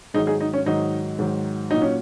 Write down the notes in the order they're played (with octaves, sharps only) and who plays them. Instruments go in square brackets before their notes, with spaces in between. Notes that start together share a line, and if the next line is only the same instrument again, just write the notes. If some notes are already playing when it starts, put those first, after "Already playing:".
[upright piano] G#2 D#3 F#3 D#4 G#4
D#4 G#4
D#4
C#4
G#2 D#3 F#3 D#4
G#2 D#3 F#3
A#2 F#3 D#4
C#4